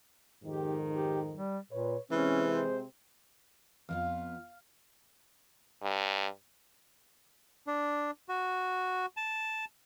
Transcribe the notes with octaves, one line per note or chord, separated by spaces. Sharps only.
F2 G#2 D#3 G4
G4
G3
A#2 B4 C#5
C3 E3 G#3 C4 C#4
C5
F2 B3 F4 F5
G2
D4
F#4
A5